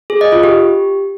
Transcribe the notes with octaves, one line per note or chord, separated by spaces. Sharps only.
G#4
D#5
F4
G4